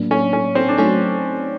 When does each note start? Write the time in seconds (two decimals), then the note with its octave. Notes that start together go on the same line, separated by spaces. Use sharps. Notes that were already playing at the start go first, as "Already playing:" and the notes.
Already playing: A2 F#3 A#3 D4
0.11 C#4
0.33 C#4
0.55 C4
0.68 D4
0.78 F#3 A3 C4 C#4 D#4 F#4